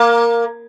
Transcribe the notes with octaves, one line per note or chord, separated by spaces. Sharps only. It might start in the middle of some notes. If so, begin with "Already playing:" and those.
Already playing: A#3